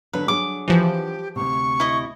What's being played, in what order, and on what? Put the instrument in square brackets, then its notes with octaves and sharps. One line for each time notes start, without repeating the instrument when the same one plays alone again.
[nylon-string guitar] D3 F#3 D4 [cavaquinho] B4
[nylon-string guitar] F#3 D4 G#4 [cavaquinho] D6
[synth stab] E3 F3 [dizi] G4
[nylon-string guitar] D2 C3 [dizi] C#6
[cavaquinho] E4 D#5